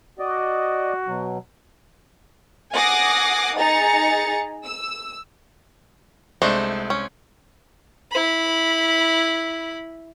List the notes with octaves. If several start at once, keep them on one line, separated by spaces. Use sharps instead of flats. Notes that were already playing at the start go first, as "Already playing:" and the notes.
F#4 D5 D#5
B2 F#3
F#5 G#5 D6 D#6 A#6 C7
D#4 G#4 A#5 A6 C#7
E6
C2 G#3 A3 D4 D#4 C5
C#4
E4 B5